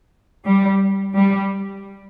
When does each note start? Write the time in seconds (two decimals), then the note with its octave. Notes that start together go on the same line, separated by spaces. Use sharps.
0.45 G3
1.15 G3